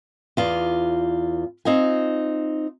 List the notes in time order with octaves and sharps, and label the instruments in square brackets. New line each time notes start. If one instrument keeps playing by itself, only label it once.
[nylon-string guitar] E2 F4 D5
C4 D#4 F4 G#5